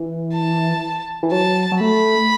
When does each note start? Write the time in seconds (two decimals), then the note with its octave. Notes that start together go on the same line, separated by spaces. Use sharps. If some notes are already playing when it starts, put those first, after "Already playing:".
Already playing: E3
0.33 A5
1.23 E3
1.32 F#3 A5
1.72 F#3
1.81 A3 B5